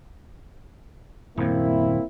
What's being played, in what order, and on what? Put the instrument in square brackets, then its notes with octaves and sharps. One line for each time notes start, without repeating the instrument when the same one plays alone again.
[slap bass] D#1 F#2 [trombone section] A#3 C4 E4